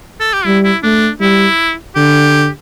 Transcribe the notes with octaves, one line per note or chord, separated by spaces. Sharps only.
A4
G4
G3 E4
E4
A3 D4
G3 E4
D3 G4